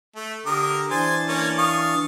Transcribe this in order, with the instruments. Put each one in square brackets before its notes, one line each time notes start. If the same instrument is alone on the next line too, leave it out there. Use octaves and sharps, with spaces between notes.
[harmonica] A3
[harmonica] D3 A#4 D#6 [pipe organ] G4
[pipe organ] E3 D4 A6 [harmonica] C5 G#5
[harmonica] A#3 C#4
F5 C#6 D#6